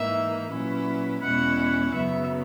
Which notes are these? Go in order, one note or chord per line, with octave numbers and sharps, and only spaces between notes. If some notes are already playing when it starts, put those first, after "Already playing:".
Already playing: G#2 E3 A#3 D#4 E5
A#2 F#3 C#4 E4 B4
E2 B2 G#3 C#4 E4 F#5
F#5
F#2 C#3 F#3 B3 E5